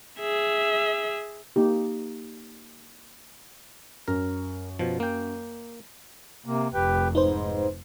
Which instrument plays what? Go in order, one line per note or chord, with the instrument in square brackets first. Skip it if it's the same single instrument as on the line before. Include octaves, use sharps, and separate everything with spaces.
[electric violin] G#4 E5
[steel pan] A#3 D#4 G4
[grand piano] F#2 [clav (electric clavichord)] A#4
[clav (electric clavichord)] B2 F3
A#3 G5
[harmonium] C3 A#3
[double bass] F1 F2 [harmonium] G4 B4 G5
[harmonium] G#2 [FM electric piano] D#4 B4 C5